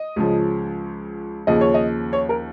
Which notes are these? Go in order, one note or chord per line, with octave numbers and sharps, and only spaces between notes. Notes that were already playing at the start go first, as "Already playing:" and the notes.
Already playing: D#5
C#2 C#3 F3
D#2 C#3 F3 D#5
C#5
D#5
C#5
A#4